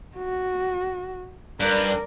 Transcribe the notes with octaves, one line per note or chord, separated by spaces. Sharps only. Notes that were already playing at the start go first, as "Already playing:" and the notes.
F#4
G2 A#4 D5